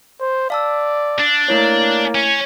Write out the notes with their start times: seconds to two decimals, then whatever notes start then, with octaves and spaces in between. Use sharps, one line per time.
0.20 C5
0.50 D5 F5 A5 E6
1.19 D4
1.48 A3 A#3 E4 C#5
2.15 C#4